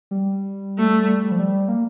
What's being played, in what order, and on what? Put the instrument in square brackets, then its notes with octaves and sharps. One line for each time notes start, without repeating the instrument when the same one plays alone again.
[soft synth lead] G3
[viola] A3
[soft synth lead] G3
F3
G3
A#3